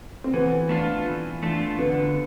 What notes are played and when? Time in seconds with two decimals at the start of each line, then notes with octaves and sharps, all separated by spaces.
0.24 C4
0.34 E3 B3
0.69 A3 D4 F4
1.05 E3
1.43 A3 D4 F4
1.79 D3 B3